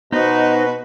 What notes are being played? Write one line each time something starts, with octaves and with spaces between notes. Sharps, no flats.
B2 B3 D#4 F#4 B4 C5 D#5